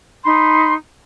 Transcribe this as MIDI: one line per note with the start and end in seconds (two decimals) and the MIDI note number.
0.24 0.73 63
0.24 0.73 83
0.24 0.73 84